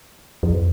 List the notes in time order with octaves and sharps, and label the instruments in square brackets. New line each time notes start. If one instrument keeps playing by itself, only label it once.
[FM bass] F2